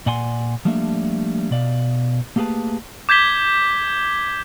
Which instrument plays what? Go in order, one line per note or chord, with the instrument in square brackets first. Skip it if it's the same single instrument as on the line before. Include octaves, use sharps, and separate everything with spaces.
[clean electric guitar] A#2 D5 F#5 G#5 C6
F3 G3 A3 A#3 D4 E5
B2 D5 F5
A3 A#3 G4 G#4 B4 A5
[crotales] D6 G6 G#6 B6 G7